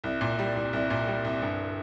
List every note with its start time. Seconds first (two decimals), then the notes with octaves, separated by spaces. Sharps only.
0.04 C2
0.21 A#2
0.39 G3
0.56 C2
0.73 C2
0.90 A#2
1.07 G3
1.24 C2
1.42 G1